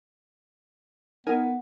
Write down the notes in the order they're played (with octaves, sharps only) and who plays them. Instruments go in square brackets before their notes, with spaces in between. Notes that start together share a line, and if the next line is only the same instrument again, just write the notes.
[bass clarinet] B3 [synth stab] D#4 A#4 G#5